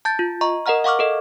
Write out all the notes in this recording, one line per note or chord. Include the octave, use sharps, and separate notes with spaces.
A5 G6 A6
F4
D#5 A#5 C#6
A#4 D#5 F#5 A#5 F6
F5 F#5 C#6 D6 F6
A4 A#4 D#5